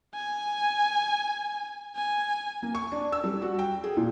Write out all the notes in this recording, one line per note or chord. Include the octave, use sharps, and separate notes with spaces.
G#5
G#5
A#3
C#6
D4
E6
G3
F#4
G5
G#4
A#2